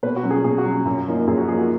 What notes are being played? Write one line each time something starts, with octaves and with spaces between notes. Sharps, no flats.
B2 B4
F#4
F#3 C#4
G#4
B2 G#4
F#4
F#3 C#4
F#2
F3 A#3 D#4
F#2 G#4
F#4
F3 A#3 D#4 G#4
F#4